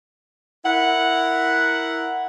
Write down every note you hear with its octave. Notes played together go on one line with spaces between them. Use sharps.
E4 A#4 F#5